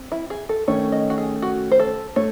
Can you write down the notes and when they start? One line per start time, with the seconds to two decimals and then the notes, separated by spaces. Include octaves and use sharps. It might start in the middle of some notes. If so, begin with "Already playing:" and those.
Already playing: C4
0.12 E4
0.30 G#4
0.49 A4
0.68 D#3 A3 C#4 C#5
0.92 D#5
1.10 F#4
1.18 G#4
1.42 F#4
1.72 C5
1.80 A4
2.16 A3 C#5